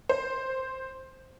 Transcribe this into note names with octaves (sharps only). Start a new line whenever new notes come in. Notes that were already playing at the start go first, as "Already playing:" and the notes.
C5